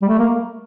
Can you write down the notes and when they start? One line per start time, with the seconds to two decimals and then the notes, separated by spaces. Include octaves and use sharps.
0.02 G3
0.08 A3
0.19 A#3